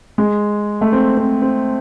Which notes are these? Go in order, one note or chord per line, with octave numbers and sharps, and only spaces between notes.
G#3
A3
C4
C4
C4